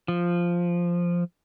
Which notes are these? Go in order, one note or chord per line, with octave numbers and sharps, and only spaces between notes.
F3